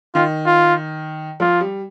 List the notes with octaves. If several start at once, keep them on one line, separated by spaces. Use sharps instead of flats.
D#3 F4
F4
F3 F4
G3